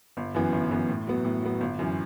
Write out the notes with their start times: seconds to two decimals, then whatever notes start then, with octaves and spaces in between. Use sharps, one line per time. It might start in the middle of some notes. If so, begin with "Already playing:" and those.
0.17 G1
0.34 F#2 E3 B3
0.52 G1
0.71 F#2 E3 B3
0.89 A2
1.07 F#3 B3
1.25 A2
1.43 F#3 B3
1.61 G1
1.79 F#2 E3